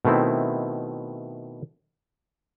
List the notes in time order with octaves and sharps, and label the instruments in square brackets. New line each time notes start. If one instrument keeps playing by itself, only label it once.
[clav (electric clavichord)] B2 D#3 A3 C4 E4